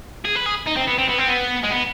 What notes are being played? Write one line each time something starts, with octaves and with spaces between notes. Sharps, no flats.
G#4
B4
G#4
D#4
C4
B3
C4
B3
C4
B3
G#3
B3